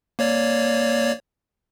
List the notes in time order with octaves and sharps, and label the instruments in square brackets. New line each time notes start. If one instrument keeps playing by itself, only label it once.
[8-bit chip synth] A#3 C#5 D5